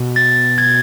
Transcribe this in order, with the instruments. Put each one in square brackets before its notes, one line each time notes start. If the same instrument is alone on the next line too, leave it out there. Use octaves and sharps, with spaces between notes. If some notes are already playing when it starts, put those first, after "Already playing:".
Already playing: [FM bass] B2
[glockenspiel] A6
G#6